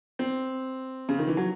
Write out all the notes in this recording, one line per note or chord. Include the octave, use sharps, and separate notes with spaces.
C4
C#3
D#3
E3
F#3